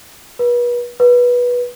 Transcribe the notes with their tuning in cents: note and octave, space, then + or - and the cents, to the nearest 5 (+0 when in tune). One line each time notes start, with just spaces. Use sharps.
B4 -35
B4 -15